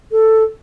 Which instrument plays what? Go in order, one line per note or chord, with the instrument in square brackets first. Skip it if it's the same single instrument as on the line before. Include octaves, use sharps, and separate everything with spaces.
[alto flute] A4